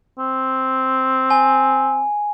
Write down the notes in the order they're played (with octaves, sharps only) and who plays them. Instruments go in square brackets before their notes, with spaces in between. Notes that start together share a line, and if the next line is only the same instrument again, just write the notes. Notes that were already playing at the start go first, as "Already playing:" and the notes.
[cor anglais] C4
[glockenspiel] G#5